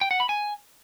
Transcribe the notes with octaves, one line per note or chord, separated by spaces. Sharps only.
G5
F#5
B5
G#5